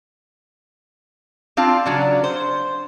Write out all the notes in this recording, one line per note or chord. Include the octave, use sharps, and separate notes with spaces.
C4 D4 F4 F5 A5
C#3 F#3 D4
C5